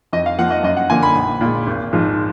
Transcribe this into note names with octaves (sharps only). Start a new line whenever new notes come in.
F2 D#5
F5
F3 A#3 F#5
D#5
F#2 D#5
F#5
D3 F3 A#3 G#5
B5
A#1
A#2 G#3
G#1
G#2 F3 G#3